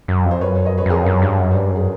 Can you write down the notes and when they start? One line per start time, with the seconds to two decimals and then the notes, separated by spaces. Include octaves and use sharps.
0.08 F#2
0.25 F2
0.31 C5
0.41 F#2 B4 C#5
0.65 C#5 D#5
0.78 B4 C#5
0.86 F#2
0.89 F2 G#4 A#4
1.06 F#2
1.22 G2
1.39 F#2
1.54 G2
1.71 F#2 G#4